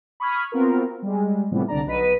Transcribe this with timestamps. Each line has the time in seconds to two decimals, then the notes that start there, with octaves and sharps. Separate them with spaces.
0.20 B5 C#6 D#6 F6 G#6
0.52 B3 C4 F4 F#4 A#4
1.02 G3 G#3
1.51 A2 C3 E3 F3 G3 B3
1.68 C2 D3 D4 D5 A#5
1.86 B1 F#3 B4 D#5 B6 D#7